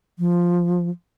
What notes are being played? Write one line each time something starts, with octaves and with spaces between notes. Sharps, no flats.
F3